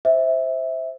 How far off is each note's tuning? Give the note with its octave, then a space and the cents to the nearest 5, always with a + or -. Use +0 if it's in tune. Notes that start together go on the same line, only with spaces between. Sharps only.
C5 +0 E5 -15